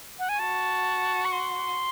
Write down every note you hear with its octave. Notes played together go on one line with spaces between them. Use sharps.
F#5
G#5
F#4 A5
C#6
C6